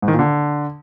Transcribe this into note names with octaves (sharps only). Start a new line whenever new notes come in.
G#2
D#3
A#2
D3